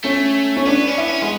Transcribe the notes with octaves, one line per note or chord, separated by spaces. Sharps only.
A3 C#4
C#4
B3 D4
C#4
B3 E4
C#4
G#3 B3